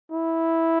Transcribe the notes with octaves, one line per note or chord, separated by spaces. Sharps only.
E4